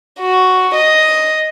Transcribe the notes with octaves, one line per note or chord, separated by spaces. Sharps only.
F#4
D#5